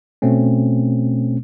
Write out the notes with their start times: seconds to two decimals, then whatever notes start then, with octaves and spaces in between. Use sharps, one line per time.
0.22 B2 A3 C4 C#4